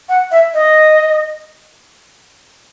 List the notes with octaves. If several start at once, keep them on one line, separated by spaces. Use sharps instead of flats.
F#5
E5
D#5